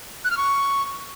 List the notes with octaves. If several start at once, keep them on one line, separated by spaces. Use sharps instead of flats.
F#6
F6
C#6